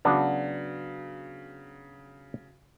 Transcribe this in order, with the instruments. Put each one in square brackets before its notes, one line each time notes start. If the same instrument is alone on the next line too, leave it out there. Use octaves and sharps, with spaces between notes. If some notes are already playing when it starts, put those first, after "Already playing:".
[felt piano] C#3 F#3 [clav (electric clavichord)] B3 D4